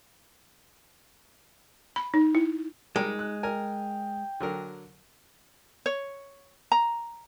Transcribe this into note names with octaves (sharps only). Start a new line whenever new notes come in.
B5
D#4
E4
G3 G#3 D#4 A#4 G5
F#6
A#4 G5 G#5
D3 F#3 A#4
C#5
A#5